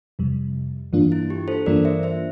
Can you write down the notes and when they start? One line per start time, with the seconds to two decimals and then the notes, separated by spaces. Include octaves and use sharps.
0.19 F2 C3 G3
0.93 G2 E3 A#3 D4 F4
1.12 E4
1.30 G4
1.48 A4 C5
1.66 G2 E3 A#3 D4 F4 A#4 D5
1.85 C5 E5
2.03 C5 E5